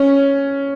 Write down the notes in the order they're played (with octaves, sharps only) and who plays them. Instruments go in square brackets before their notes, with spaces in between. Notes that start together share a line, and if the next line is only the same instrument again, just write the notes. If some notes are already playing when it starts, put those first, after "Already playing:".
Already playing: [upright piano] C#4